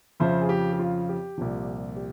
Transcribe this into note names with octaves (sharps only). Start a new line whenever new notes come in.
F2 C#3 F3 C5 E5
G#4
G4
G4
F4
G4
C2 A#2 F3
G4